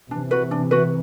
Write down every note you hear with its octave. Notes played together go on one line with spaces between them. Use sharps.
C3 E3 D4
F#4 B4
D4
F#4 B4